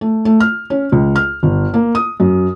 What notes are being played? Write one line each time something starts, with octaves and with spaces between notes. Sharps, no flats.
A3
A3
F6
C#4
C#2
F6
G1
A#3
D#6
F#2